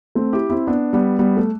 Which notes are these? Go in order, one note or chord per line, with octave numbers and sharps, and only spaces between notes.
A3 C4
E4 G4
C4 E4
B3 D4
G3 B3
G3 B3
A3